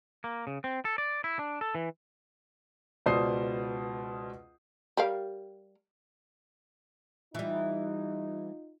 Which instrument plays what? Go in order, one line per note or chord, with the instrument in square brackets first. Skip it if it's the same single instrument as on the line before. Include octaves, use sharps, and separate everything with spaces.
[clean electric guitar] A#3
C#3
C4
A4
D5
E4
D4
A4
E3
[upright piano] C#2 B2 C5 D5 D#6 C7
[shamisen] G3 A#4 F5
[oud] E3 G3 [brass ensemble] D#4 F4